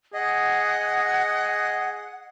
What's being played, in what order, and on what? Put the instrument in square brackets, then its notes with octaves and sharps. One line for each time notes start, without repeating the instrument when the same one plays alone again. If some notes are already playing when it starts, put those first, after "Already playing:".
[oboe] G#4 [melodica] D#5 [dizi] F#5